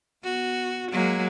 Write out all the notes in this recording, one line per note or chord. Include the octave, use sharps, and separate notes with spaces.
B3 F#4
F#3 G#3 A#3